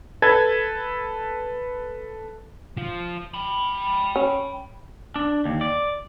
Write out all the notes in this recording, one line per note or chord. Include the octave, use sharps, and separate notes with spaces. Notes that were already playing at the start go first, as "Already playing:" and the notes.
A4 B4 G#6
F3
G5 B5
C#4
D4
D#2
D5